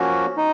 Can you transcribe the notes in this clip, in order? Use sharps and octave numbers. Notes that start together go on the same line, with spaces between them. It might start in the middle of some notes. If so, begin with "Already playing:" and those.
Already playing: F3 A#3 C#4 F#4
D#4